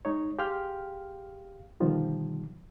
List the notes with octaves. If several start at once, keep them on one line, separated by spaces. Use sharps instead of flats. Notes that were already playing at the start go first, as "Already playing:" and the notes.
G#3 D#4 C#5
G4 G#4 F5 G5 C6 F6
B2 D3 D#3 F3 G3